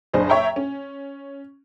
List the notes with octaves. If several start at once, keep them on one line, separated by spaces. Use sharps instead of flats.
F#1 D4 G#4 C5 D#5
C#5 E5 G5 A#5
C#4